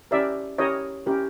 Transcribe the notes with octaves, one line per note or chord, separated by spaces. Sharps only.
C#4 E4 G4 A#4 D5 E5
C#4 E4 G4 A#4 C#5 D#5
C#4 E4 G4 A#4